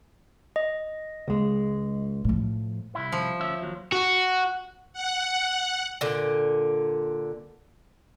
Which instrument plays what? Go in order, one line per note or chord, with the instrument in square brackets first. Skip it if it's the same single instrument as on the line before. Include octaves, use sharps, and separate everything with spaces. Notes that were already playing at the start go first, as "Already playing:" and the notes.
[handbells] D#5
[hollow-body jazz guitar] C#2 G#3
[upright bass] A2 F3
[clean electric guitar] C2 E4
[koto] F3
[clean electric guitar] D2 C#4 E5
D#2 F#3
[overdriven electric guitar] F#4
[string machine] F#5
[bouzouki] A#2 D3